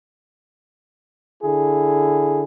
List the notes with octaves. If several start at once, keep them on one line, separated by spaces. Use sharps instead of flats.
D3 E4 G#4